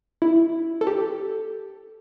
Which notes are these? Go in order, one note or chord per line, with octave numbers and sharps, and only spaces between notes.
E4
A4
G4